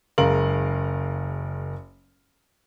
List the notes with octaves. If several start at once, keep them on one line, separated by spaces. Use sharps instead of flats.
F#1 G#3 A#4 F5 F#7